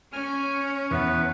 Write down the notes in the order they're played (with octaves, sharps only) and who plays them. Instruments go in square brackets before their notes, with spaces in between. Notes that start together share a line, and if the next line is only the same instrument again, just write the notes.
[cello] C#4 [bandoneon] G#5 F6
[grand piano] E2 [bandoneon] B3 B4